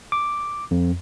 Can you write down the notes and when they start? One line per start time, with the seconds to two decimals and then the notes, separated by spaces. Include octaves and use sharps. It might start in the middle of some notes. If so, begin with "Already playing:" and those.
0.12 D6
0.71 F2